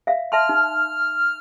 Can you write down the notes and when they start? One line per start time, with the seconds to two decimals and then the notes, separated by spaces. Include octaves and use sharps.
0.07 E5 F5
0.32 E5 A5 C6 F6
0.49 D#4